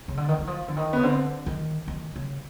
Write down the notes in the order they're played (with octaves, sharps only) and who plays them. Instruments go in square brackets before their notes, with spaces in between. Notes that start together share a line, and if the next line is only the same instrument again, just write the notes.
[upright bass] C#3
D3
D#3
E3
F3
D3
D#3
[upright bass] C#3 [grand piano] B3
[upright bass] D3 [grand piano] C4
[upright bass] D#3
D#3
C#3